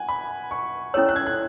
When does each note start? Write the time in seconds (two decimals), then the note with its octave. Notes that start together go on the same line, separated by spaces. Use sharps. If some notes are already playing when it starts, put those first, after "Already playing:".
Already playing: F#5 G#5
0.09 B5
0.51 C#6
0.94 C#4 E4 A4 C#5 E6
1.09 F#6
1.16 G#6
1.26 F#6